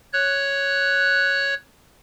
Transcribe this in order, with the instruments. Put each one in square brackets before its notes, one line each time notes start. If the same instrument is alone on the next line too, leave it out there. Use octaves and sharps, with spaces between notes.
[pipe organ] C#5 F#6